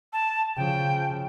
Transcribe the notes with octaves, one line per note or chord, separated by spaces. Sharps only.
A5
C#3 F3 G5